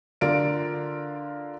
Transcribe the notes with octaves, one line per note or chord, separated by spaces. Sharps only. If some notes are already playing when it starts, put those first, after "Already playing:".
D3 F4 A#4 D5 D7